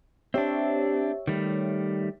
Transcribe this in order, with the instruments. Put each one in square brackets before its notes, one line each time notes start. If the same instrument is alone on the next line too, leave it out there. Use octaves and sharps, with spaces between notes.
[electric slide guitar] C4 D4 [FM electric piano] G4 C#5 E5
[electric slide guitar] D#3 G3 A3